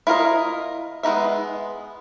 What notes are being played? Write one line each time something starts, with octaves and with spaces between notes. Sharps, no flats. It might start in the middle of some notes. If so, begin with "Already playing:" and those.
E4 F4 A#4 D#5
G#3 B3 D#4 E5